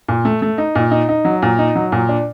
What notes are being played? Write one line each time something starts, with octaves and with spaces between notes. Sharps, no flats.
A#2
A3
A3
D#4
A#2
D#4
D#4
F#3
A#2
D#4
F#3
A#2
D4